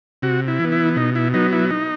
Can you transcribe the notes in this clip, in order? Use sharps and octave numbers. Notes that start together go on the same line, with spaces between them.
C3 F#4
E4
E3 B3
E4
B2 D#4
E4
F#3 B3 D#4
E4
D#4